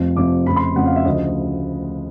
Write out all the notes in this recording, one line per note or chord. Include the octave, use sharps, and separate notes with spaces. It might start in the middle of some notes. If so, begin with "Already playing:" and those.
Already playing: F1 F2 C3 F3
F1 F2 C3 F3 D6
F1 F2 C#3 B5
C6
F1 F2 C#3 F#5
F5
E5
D2 C#3 F3 D#5